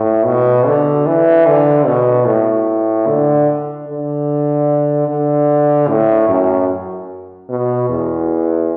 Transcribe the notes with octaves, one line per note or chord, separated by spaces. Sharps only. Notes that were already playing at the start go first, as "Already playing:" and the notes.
Already playing: A2
B2
D3
E3
D3
B2
A2
D3
D3
D3
A2
F#2
B2
E2